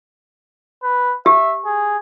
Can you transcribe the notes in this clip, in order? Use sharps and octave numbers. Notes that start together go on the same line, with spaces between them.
B4
G4 E5
G#4